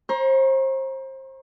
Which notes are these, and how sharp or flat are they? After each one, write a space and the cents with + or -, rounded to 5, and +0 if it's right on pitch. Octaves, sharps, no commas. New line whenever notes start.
C5 +30 A#5 +30 C#6 -35